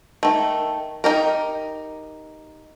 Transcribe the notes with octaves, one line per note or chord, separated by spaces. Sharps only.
D#3 A3
D#4 G4 A#4